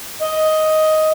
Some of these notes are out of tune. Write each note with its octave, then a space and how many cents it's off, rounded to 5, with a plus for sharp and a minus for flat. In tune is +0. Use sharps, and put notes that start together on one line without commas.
D#5 +10